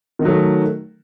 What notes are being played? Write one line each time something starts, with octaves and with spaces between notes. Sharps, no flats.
D#3 F#3 A3 D#4